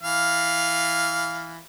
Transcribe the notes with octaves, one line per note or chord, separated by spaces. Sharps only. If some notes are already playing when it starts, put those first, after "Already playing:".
E3 F5